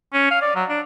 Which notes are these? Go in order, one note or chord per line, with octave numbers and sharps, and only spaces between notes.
C#4
F5
D5
F#3
D4